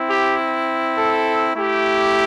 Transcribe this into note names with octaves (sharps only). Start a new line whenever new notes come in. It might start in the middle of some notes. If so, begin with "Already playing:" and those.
Already playing: C4 E4
G4
A4
A3 E4 G4